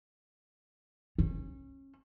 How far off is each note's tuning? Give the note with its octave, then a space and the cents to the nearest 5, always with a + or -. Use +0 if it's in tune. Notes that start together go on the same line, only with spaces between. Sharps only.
C#4 -30